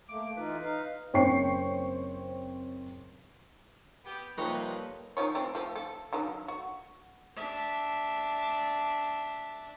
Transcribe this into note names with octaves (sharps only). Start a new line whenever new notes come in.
A3 A#3 D6
E3 D#4 F4 B4
D#4 F5
F#1 C4 C#5 G5 C#6 C7
B3 G4
F2 C3 G3 A#3 D#4 B4 C#5
D#3 F3 C#5
F3 A3 C4
F3 A3
A4
D3 D#3 F#3
F#4
D4 E5